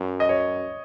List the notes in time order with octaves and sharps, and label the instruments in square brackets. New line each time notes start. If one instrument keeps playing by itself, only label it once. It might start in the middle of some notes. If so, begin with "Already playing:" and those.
Already playing: [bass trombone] F#2
[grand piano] D#5
C#5